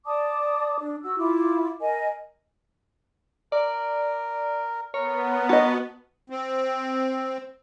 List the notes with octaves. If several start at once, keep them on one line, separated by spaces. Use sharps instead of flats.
D5 A5 D6 D#6
D4
F#4 E6
E4 F4 D6
A#4 D#5 G#5
A#4 D5
B3 A#4 C#5
F#4 D#5 A5
C4